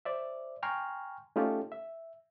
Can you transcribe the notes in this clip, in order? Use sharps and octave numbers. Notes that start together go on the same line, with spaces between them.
C5 D5 E5
G5 G#5 A#5 C6 C#6 F6
A3 C#4 D#4 F4 G4 A4
E5